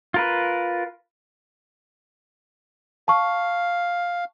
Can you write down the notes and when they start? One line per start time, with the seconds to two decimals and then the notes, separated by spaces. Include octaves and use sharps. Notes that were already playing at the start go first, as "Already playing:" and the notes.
0.14 F4 A#4 B4
3.08 F5 A5 C#6